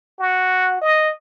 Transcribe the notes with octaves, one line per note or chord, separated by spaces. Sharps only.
F#4
D#5